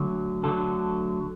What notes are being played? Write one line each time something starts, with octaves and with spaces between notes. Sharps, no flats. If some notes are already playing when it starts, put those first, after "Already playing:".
Already playing: D2 D3 F#3
D2 D3 F#3 A4